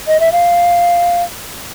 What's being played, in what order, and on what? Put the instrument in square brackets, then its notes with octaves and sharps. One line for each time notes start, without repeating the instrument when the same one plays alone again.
[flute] D#5
E5
F5